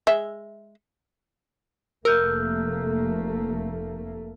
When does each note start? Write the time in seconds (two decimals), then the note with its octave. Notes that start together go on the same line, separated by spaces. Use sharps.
0.07 G#3 E5
2.05 F1 A3 A#3 A#4 E6 F6 G6